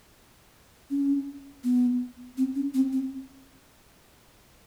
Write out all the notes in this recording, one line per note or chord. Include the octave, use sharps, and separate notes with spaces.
C#4
B3
C4
C#4
C4
C4